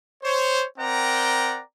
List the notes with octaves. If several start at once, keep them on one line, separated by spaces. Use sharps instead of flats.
C5 C#5
C4 A#4 D5 F#5 G5 A#5